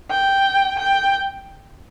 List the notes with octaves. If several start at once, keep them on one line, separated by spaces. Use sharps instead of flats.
G5
G5